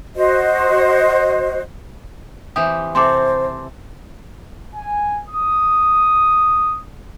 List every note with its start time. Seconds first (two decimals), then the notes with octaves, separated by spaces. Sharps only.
0.16 F#4 C5 D#5
2.56 E3 C4 G4 D#6
2.95 C3 C4 A4 C5 C6 D6
4.75 G#5
5.28 D#6